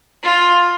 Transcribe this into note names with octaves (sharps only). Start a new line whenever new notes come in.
F4